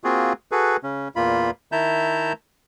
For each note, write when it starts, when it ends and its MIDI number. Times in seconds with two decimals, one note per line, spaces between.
0.04 0.33 58
0.04 0.33 60
0.04 0.33 65
0.04 0.33 66
0.04 0.33 68
0.52 0.77 66
0.52 0.77 68
0.52 0.77 69
0.52 0.77 71
0.83 1.08 49
0.83 1.08 61
1.16 1.51 40
1.16 1.51 46
1.16 1.51 58
1.16 1.51 65
1.16 1.51 83
1.72 2.33 51
1.72 2.33 64
1.72 2.33 76
1.72 2.33 81
1.72 2.33 82
1.72 2.33 91